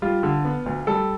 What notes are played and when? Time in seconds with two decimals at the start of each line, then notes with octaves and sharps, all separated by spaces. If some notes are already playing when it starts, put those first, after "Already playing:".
0.02 G3 F4
0.23 D3
0.45 B3
0.66 D2
0.87 G3 A4